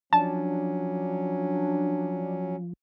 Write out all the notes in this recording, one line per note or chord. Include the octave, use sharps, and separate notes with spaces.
F3 F#3 C#4 D4 A5